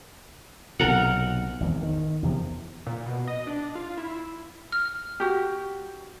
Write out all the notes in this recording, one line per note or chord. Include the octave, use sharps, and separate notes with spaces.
B1 C3 A#4 F#5
G#1 E2
D#3
E2 C3 F3
A#2
B2
D#5
D4
F4
E4
F6
F#4 G4